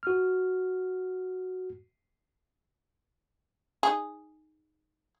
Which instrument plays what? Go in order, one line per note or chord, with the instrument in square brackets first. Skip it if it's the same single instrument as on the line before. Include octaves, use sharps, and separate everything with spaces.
[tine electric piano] F#4 F6
[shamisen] D#4 G#4